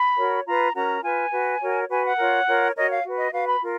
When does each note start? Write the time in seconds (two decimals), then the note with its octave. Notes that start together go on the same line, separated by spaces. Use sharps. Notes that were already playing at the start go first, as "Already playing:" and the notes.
Already playing: B5
0.17 F#4 A#4 C#5
0.46 F4 B4 A#5
0.75 C#4 F#4 A#4 A#5
1.03 F4 B4 G#5
1.32 F#4 B4
1.60 F#4 A#4 C#5
1.89 F#4 B4 G#5
2.04 F#5
2.18 F4 A#4 C#5
2.47 F4 A#4 C#5
2.76 F#4 A#4 C#5 D#5
2.90 F5
3.04 F#4 B4
3.18 D#5
3.32 F#4 B4 F5
3.48 B5
3.61 F4 A#4